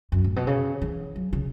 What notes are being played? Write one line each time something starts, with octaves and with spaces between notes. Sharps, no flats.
F#2
A2
B2
C#3
E3
F#3
C#3